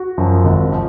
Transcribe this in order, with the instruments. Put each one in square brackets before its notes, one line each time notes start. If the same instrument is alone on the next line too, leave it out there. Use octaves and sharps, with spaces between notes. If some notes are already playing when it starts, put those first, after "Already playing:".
Already playing: [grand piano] F#4
F#2 F3
G#1
F3